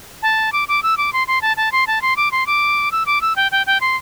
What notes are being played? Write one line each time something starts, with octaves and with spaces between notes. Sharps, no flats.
A5
D6
D6
E6
D6
C6
C6
A5
A5
C6
A5
C6
D6
C6
D6
E6
D6
E6
G5
G5
G5
C6